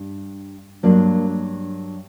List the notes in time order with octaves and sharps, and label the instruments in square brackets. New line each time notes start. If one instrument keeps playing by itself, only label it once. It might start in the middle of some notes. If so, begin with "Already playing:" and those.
Already playing: [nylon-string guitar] G2
G2 F#3 A#3 D4